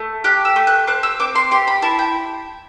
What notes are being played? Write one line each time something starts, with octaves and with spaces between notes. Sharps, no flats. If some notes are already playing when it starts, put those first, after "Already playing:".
Already playing: A3
G4 F#6
E6
A3
F#6
C4 F#6
E6
C4 D6
C6
G4 C6
B5
E4 A5
G5